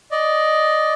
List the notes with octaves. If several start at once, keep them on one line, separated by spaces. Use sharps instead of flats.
D5 D#5